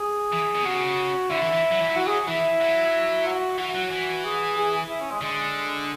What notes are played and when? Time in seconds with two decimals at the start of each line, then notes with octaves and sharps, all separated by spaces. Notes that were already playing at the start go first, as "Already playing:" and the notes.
Already playing: G#4
0.32 E3
0.55 B2
0.65 C#3 F#4
1.30 D3 E4
1.42 E3
1.53 E3
1.71 F#3
1.81 E3
1.89 F#3
1.96 F#4
2.07 G#4
2.27 E3 E4
2.61 F#3
3.26 F#4
3.58 E3 F#4
3.75 F#3
3.91 E3
4.24 G#4
4.57 G#4
4.89 E4
5.00 C#4
5.11 G#3
5.21 D3 G#3